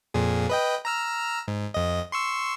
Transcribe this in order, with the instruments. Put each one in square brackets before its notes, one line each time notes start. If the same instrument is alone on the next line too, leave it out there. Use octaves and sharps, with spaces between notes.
[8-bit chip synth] F2 A#2 G#4
B4 D#5 G5
A#5 E6 F6
G#2
F2 D#5
C6 C#6 E6